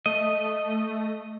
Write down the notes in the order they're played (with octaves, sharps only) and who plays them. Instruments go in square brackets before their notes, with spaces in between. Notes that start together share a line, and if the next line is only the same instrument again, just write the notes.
[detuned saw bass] A3 [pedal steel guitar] D#5